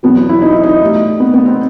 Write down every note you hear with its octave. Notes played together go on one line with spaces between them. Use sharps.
E2 B2 F#3 B3
E4
D#4
E4
D#4
A2 G3
B3
B3
C4